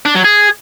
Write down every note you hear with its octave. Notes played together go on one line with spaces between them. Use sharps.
D4
F#3
G#4